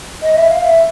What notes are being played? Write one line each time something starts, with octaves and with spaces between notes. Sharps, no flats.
D#5
E5
F5
E5